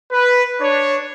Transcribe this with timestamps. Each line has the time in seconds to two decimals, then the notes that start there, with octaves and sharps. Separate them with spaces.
0.12 B4
0.61 D4 C#5